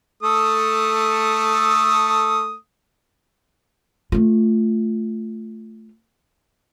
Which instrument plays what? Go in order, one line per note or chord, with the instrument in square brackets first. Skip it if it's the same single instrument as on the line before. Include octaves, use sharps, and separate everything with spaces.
[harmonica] A3 A4 D#6
[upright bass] A3 F4